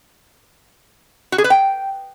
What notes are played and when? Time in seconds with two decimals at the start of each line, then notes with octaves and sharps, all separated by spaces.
1.32 F#4
1.38 G#4
1.44 B4
1.50 G5